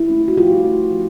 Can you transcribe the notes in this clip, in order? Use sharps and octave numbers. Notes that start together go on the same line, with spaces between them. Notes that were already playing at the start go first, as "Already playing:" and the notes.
Already playing: E4
A3 C#4
F#4
F3 F4 G4
A3 C#4
F3